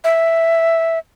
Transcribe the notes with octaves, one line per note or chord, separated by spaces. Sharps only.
E5